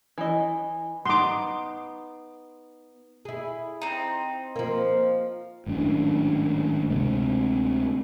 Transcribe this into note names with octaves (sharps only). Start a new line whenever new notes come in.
E3 D#5
B3 D#4 C6 D6
E4 G#4
C4 D#4
F3 A#3
G#1 F#2 A2 D4
D2 C3 G#3 C4